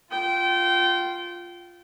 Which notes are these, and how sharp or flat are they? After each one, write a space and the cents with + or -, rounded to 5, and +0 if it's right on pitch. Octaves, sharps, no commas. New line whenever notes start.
F4 +0 G5 -25